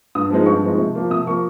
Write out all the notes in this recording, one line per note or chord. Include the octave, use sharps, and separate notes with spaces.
G2 D#6
F3 G#3 C4 D#4
G2 C#6
F3 G#3 C4 D#4
C3
F3 A#3
C3 D#6
F3 A#3 C#6